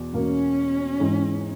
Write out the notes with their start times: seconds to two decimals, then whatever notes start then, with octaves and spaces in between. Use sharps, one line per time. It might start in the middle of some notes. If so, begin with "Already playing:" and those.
Already playing: E2 B2
0.13 E2 B2 A#3 C#4
1.00 G#2 E3 G#3